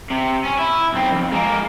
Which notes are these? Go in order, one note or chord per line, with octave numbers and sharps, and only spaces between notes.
C3
C#4
E4
B1 C4
F2
G#3 A#3